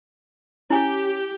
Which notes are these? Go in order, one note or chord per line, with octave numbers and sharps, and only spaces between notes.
C#4 E4 G4 G#5